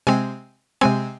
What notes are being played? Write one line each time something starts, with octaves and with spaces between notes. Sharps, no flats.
C3 G#3 C4 G#5
C3 G#3 C4 G#5